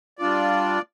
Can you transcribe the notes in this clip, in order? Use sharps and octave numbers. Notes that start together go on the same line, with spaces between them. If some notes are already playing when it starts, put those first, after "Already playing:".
G3 D4 F4 D5